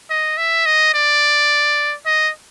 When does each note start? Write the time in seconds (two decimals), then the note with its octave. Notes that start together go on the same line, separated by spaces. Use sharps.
0.10 D#5
0.37 E5
0.66 D#5
0.94 D5
2.06 D#5